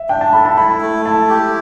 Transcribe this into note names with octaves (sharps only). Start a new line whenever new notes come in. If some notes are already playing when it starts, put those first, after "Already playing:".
Already playing: E5
D4 G5
A5
A4 B5
A5
E4 B5
A3
E4 A5
G4